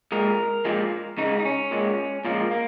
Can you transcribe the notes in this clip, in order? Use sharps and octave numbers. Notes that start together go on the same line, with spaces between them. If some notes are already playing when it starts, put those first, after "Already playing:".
A#2 G#3 A#4
A#2 F3 G#3
C#3 G#3 D#4
D#4
C#4
A#2 G#3
A#2 F3 G#3 A#3
A#3